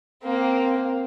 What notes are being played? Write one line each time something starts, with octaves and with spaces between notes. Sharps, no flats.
A#3 C4